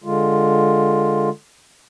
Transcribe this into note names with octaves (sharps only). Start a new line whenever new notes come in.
D3 G#3 F4